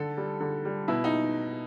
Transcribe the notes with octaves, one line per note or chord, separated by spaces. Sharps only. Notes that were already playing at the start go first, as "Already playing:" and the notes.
Already playing: D3 A4
G3
D3
G3
B2 E4
D#4